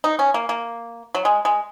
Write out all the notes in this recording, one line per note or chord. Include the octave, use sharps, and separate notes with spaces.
D#4
C#4
A#3
A#3
F#3
G#3
G#3